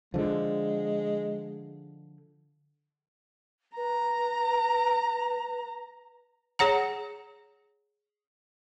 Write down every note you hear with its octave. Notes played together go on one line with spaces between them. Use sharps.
D3 F3 G#3
B4 A#5
G#4 C#5 F#5 A#5